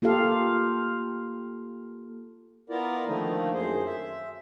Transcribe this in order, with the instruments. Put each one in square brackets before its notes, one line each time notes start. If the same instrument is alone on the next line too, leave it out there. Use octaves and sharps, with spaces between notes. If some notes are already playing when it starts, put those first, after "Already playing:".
[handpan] A#3 F4 G4 A4 F5
[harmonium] B3 E4 F4 A#4 D5
D3 D#3 F3 A3 A#3 D#4
F#2 G#4 C5
E5